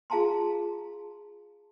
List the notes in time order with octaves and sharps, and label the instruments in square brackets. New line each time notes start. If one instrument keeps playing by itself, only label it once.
[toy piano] F4 G#4 F5 A5 A#5 C6